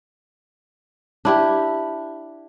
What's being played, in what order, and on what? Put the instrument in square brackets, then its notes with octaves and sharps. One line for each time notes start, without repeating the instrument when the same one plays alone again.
[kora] D4 E4 G4